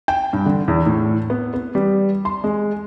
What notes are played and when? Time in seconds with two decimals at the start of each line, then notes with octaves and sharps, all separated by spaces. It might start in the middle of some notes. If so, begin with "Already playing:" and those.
0.08 G5
0.33 G2
0.46 D3
0.68 E2
0.86 A2
1.30 B3
1.54 B3
1.75 G3
2.25 C6
2.44 G#3